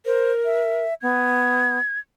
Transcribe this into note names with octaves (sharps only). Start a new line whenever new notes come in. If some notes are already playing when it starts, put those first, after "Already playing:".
A#4 C5
E5
B3 G#6